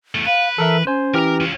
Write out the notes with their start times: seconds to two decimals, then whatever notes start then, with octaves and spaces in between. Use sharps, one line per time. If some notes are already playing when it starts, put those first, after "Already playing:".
0.15 E2 A3
0.26 B4 F5
0.58 E3 A4 A#4 E5
0.87 C#4 C5 G#5
1.14 E3 G4 A#4 A#5 F6
1.41 C#4 F4